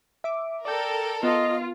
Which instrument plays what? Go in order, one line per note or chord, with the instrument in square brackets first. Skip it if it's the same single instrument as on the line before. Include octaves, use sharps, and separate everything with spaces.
[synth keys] E5 D6
[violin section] A4 A#4 [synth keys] D5 G5
[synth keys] B3 [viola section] F4 [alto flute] D#5